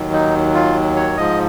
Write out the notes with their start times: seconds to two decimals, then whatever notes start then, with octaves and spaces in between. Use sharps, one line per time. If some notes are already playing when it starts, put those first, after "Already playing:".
Already playing: D#2 D#3 F#3
0.13 D#4
0.55 F4
0.96 C#5
1.17 G#2 F3 D#5